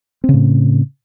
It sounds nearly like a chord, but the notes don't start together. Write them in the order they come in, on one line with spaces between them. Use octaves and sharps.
C4 C#3 A2